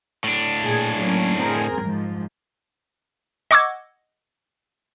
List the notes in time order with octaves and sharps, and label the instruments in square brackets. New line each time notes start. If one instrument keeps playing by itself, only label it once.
[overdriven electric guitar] A2 D4
[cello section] A#2 G#4
F#3 A#3 C#4
C4 G#4 A#4
G#2 F3
[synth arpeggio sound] D#5 F#5 C#6 D6 E6 G#6